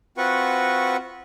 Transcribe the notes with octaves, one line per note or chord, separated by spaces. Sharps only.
C4 F4 F#4 B4 F#5 C#6